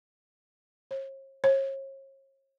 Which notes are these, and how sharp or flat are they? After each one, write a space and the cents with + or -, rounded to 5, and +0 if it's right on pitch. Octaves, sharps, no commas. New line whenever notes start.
C#5 -45
C#5 -40